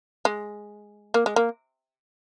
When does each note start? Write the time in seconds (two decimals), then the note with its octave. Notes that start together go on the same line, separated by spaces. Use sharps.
0.25 G#3
1.14 A#3
1.26 G#3
1.36 A#3